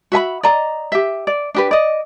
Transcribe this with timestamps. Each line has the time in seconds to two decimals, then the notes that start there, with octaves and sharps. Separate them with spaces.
0.12 F#4 E5 G#5 B5
0.43 D5 D#5 A#5
0.92 G4 E5
1.27 D5
1.54 D4 G4 B4
1.71 D5 D#5